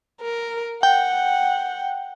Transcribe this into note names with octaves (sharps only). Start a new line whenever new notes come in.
A#4
F#5 G5